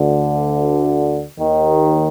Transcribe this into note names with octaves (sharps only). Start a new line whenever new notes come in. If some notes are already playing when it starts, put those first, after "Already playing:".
Already playing: D2 D3
D#2 D#3